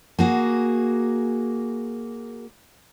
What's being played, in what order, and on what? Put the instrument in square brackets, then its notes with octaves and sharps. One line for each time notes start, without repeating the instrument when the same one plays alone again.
[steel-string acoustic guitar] A#3 F#4 G#4